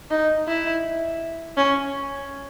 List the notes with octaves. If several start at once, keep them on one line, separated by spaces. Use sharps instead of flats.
D#4
E4
C#4